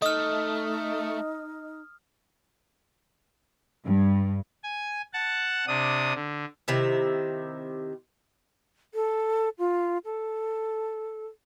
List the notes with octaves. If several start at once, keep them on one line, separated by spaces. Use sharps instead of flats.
A3 D#4 D#5 D#6 F6
G2
G#5
F#5 A5
C3 D4 D#6
D3
C3 D#3 E4
A4
F4
A4